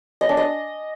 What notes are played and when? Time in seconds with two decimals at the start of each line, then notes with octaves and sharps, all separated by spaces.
0.21 D#5
0.29 D4
0.37 D#5